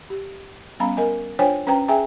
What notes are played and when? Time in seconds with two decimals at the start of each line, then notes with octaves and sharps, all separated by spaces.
0.10 G4
0.80 G3 B3 C#4 F5 A#5 B5
0.97 A#4 D#5 G#5
1.39 D4 F4 C5 C#5 G5 G#5
1.67 C#4 B4 C5 G5 A#5
1.88 G#4 E5 G5 G#5 A#5